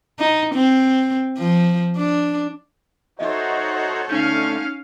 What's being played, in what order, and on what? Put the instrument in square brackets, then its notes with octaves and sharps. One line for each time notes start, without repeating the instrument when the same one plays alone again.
[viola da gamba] D#4
C4
F3
D4
[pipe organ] D#4 F#4 C5 [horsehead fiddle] A4 C#5 [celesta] D#5 E5
[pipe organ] D3 A3 [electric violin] C#4 F5 [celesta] D#4 G6